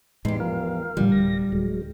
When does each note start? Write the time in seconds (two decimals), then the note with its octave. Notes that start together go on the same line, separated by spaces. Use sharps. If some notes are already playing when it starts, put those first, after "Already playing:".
0.25 E2 A2 G#3 D#4 G4 C6
0.40 F3 A#4 F5
0.97 A2 D3 F3 G3
1.12 D1 A#6
1.52 D1 F#3 G#3